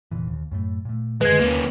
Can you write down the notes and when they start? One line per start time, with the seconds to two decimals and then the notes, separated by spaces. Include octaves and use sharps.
0.11 F1 A#2 E3
0.27 D#2
0.51 F#2 A2 A3
0.85 A#2 A3
1.21 F#2 D3 D#3 G#3 B4 G#6
1.40 D#2 A#3 C#4